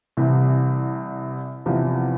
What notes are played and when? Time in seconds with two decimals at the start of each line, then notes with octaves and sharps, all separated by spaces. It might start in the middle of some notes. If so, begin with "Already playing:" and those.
0.17 C2 C3 E3
1.66 E2 C3 F3